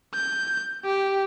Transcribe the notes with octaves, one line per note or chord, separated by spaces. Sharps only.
G6
G4